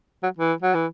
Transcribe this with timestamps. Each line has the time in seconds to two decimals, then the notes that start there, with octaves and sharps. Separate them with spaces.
0.23 F#3
0.39 E3
0.62 F#3
0.75 E3